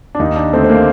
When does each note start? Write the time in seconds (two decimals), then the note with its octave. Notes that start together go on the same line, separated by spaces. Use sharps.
0.15 D4
0.19 D#2 D#4
0.36 D4
0.53 D3 A3 C4
0.64 C4
0.70 A#3